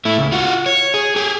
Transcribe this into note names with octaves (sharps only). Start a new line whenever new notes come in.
A3 E4
C#2
F4 F#4
C#5
G#4
G4 G#4